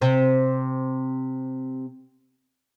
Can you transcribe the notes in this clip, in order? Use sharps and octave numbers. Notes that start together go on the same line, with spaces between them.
C3 C4